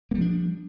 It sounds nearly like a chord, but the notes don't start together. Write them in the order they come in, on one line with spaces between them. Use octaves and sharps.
A#3 G3 F3 D4